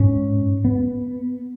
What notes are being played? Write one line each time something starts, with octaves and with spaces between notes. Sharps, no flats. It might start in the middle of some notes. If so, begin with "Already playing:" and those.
Already playing: G#2 C#4
B3